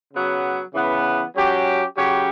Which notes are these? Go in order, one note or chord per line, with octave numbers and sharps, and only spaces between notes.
C#3 F#3 B3
C#3 E3 B3
F#3 C#4 G4
C#3 F#3 C#4 G4